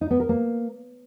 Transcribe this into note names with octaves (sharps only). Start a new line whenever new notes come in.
D#4
B3
A#4
A#3